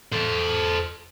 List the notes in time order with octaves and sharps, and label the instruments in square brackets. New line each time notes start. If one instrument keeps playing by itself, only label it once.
[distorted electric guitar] A4 C5